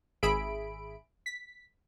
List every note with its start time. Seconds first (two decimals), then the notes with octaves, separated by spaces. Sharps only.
0.23 G#1 G#4 E5 B5 D7
1.26 B6